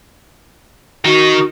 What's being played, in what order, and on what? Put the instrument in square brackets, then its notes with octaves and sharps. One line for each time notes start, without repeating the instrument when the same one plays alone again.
[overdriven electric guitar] D#3 D#4 [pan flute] F#4